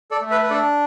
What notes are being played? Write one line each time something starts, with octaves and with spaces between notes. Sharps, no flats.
A4 D5
A3
B4 E5
B4
D4 A4 D5